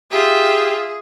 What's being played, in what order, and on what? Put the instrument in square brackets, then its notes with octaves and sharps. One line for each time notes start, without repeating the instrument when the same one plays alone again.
[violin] F4 E5 [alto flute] G4 [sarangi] G#4